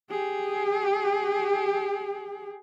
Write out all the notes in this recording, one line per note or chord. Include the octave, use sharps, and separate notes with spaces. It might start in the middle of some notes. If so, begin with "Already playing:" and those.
G4 G#4